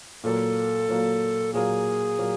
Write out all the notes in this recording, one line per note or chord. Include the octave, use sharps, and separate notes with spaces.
A#2 F#3 A#3 A4
A#2 F#3 A#3
A#2 F#3 A#3 G#4
A#2 F#3 A#3